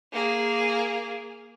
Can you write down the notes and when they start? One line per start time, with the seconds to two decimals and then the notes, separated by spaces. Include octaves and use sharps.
0.12 A#3 G#4